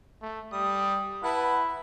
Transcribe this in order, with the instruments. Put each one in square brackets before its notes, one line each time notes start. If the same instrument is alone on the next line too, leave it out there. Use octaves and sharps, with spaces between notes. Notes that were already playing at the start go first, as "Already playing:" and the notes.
[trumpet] A3
[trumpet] G3 [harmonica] D#6
[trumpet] E4 [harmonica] B4 F#5 A5